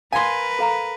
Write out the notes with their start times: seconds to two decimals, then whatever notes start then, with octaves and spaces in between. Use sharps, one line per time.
0.13 A#4 B4 F5 G#5 C6
0.59 A4 F5 A#5